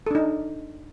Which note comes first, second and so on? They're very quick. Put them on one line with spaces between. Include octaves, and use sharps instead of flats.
A4 D4 D#4